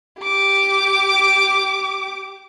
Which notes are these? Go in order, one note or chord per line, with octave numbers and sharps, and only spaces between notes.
G4 D6